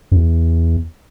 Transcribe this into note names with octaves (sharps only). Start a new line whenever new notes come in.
F#2
E2